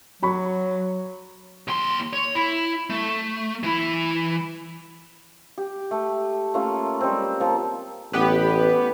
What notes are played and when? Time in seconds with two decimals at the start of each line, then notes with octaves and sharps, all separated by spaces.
0.22 F#3 F#4 B5 C#6
1.68 D#2 C6
2.13 C#5
2.35 E4
2.90 A3
3.63 E3 E4
5.58 G4
5.91 A3
6.54 A3 A#3 C#4 F4
7.01 G3 G#3 C4
7.40 F3 A#3
8.13 A1 B3 G4 B4